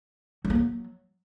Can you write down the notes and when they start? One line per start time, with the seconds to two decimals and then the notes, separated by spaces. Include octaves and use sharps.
0.45 F#3
0.50 A#3
0.55 F#3